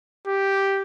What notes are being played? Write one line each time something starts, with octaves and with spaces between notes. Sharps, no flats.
G4